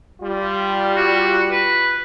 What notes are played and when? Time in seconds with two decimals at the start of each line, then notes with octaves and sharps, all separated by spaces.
0.21 G3 F4
0.97 F#4
1.51 B4